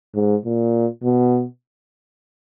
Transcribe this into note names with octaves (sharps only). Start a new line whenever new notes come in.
G#2
A#2
B2